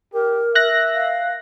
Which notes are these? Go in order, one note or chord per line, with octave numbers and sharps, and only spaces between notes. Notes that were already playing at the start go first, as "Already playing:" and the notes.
G4 A#4
E5 F#6 A#6
F5